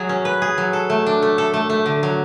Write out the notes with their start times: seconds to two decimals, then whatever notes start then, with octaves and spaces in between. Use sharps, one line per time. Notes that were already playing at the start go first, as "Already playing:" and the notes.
Already playing: F#3 G#4
0.09 C#4
0.25 B4
0.42 G#4
0.58 F#3
0.73 A4
0.90 A3
1.06 D4
1.23 A3
1.38 A4
1.54 A3
1.70 A3
1.86 D3
2.03 F#3